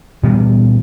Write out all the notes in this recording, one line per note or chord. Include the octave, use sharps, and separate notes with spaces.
A#2 E3 G3 B3